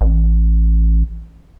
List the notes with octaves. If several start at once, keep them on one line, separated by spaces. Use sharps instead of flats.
A1